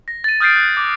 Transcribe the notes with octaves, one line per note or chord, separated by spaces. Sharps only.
A#6
A6 D#7
D#6 F6 G6 A6 C7 D7
F#6
D6